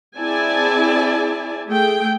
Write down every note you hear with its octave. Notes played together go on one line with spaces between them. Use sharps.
C4 E4 G#4 D5 G#5 A5
A3 G#4 G5